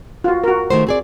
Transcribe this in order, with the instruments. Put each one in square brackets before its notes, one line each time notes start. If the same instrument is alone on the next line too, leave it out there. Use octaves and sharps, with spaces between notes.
[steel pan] F4 F#4
F#4 A#4
[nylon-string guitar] D#3 A3 C5
C4 G#4 D5